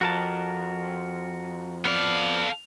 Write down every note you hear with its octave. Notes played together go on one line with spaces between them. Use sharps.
F2 F#4 A#4 A5
B3 A4 D5 F5